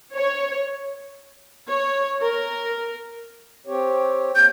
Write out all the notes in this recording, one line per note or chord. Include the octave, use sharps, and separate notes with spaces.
C#5
C#5
A#4
C4 G4 C#5
A#3 G6